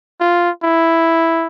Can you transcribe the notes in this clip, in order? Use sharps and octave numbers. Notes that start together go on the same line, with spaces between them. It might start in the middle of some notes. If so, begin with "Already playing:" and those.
F4
E4